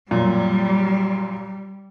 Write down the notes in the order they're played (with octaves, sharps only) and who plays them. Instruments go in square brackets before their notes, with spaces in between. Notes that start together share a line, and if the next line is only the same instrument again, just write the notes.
[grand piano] F#2 A#2 [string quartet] G3